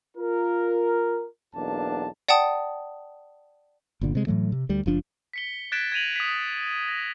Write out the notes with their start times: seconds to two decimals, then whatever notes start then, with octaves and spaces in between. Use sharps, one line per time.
0.17 F4 A#4
1.55 B1 E2 A#3 D4 A5
2.29 D5 F#5 G5 A5 D#6
4.01 G1 A#2 D3
4.15 C3 G#3
4.27 A2 E3 F#3 A3
4.52 C3
4.69 D2 G3
4.86 F#1 F3 D4
5.33 B6 C#7 G7
5.72 F#6 G#6 A6 B6 D7 E7
5.92 G#6 A#6 D#7 F7 F#7
6.16 D#6 B6
6.89 A#6